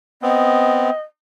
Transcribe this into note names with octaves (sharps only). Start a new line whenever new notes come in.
B3 C4 D#5